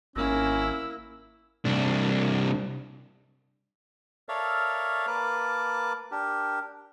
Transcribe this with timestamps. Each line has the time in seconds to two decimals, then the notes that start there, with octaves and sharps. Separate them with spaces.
0.16 G#1 A#3 C#4 E4 E6
1.65 C2 D4
4.29 A4 A#4 C#5 D5 E5 F5
5.07 A#3 A#4 B4 A5 D6
6.11 D4 G4 A#4